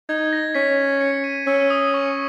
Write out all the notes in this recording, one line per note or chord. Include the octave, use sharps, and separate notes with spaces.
D#4 G#6
A#6
C#4 B6
C#7
D#7
C#4 E6
D#6
C#6